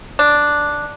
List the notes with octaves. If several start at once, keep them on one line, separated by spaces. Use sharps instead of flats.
D4